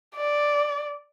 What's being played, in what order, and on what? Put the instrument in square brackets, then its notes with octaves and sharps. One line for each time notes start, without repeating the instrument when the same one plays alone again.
[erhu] D5